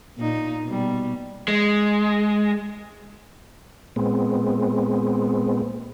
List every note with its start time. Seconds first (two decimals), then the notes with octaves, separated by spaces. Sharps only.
0.18 A#2 D#4
0.64 B2 G3
1.48 G#3
3.96 A#2 G#3 B3 C4